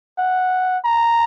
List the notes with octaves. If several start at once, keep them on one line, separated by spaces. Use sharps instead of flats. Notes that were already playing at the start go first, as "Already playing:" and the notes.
F#5
A#5